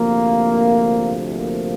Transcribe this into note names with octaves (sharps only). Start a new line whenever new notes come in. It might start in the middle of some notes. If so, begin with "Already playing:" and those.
Already playing: D2 C3 F3 A#3
A#3